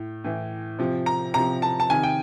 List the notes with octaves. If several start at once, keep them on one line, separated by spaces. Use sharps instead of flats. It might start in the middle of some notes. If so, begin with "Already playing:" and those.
Already playing: A2
A2 E3
C3 F3
A#5
C3 F3 A#5
A5
A5
C3 D#3 G#5
G5